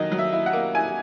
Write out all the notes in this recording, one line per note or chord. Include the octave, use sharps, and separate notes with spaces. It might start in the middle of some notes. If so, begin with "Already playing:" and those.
Already playing: D#3 F#3 D#5
F#3
E5
E4
F#5
A#3
E4 G#5